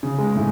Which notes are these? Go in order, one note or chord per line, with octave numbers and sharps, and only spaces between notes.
C#3
G#3
A2